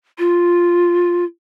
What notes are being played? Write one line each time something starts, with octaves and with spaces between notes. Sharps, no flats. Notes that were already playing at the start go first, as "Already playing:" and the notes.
F4